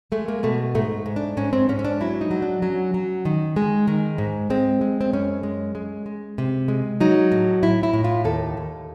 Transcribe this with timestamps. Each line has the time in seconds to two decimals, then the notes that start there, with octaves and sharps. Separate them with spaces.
0.12 G#3 A3
0.28 A#3
0.43 B2 A3
0.75 G#2 A3
1.06 G#2
1.16 D4
1.37 G#2 C#4
1.53 C4
1.69 G#2 C#4
1.79 C#4
1.84 D4
2.00 F#3 E4
2.21 D#4
2.31 F#3
2.42 D4
2.62 F#3 C#4
2.94 F#3
3.25 D#3
3.56 G#3
3.87 D#3
4.18 G#2
4.50 G#3 C4
4.81 G#3
5.01 C4
5.13 F#2 C#4
5.43 G#3
5.75 G#3
6.06 G#3
6.38 C3
6.68 G#3
7.01 F#3 D#4
7.31 A2
7.63 A2 E4
7.83 E4
7.94 A2
8.04 F4
8.25 D#2 A4
8.57 D#2